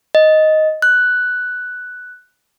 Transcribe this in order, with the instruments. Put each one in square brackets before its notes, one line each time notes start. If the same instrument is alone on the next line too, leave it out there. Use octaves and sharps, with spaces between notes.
[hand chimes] D#5
F#6